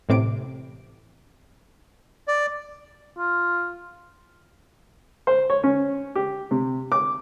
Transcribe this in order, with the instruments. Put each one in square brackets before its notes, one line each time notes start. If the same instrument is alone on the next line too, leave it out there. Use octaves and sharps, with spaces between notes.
[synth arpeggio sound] A1 A2 C3 D6 D7
[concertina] D5
[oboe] F4
[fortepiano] C5
C#5
C#4
G4
C3
D6